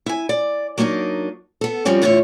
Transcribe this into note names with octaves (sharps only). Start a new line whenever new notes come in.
E4 G#5
D5
F#3 A#3 D4 D#4 D#5
B3 A4
F3 G3 C4 C#4 F#4
E2 A2 D3 E4 F4 C#5